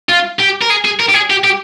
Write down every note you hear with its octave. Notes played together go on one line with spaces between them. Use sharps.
F4
G4
A#4
G#4
G#4
A#4
G4
G#4
G4
G4